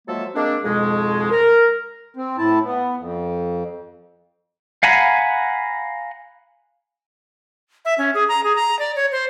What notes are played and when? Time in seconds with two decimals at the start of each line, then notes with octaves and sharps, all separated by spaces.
0.08 F3 F#3 G#3 A#3 A4 E5
0.35 G#3 A#3 C4 D4
0.64 F2 G#2 B2 G#3
1.31 A#4
2.16 C4
2.38 A2 E4 A5
2.64 B3
2.97 F2
4.83 F5 F#5 G#5 A#5 B5
7.85 E5
7.98 C#4
8.14 G#4
8.29 A#5
8.44 G#4
8.56 A#5
8.79 D5
8.96 C#5
9.12 C5